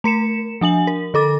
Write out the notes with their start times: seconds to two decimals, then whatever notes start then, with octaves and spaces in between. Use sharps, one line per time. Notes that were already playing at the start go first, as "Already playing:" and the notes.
0.04 A3 A#4 C#7 E7
0.61 F3 D4 G#5 F#7
0.87 A#4
1.14 D3 A4 D6 A6